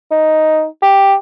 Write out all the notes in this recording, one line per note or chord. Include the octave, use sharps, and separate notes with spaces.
D#4
G4